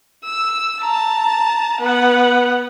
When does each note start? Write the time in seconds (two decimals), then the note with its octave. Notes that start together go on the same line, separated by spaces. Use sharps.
0.25 E6
0.82 A5 A#5
1.81 B3 F#5